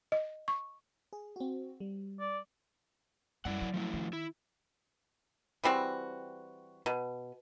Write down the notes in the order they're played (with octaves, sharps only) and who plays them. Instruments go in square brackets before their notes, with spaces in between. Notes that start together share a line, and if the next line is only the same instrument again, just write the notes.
[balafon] D#5
C#6
[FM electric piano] G#4
C4 F#4
G3
[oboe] D5
[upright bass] F#2 G3 [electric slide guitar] E4 D5 F#5
[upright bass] F#3
[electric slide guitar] F3 A3 E4
[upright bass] D#3
[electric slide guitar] E4
[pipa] E3 G3 C4 F#4
B2